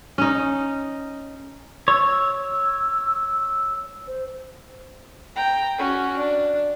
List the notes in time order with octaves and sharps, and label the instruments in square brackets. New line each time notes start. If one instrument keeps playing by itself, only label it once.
[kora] C#4 D#4
[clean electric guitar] C#5 [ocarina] E6
[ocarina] C5
[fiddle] G5 A#5
C#4 F#4
D4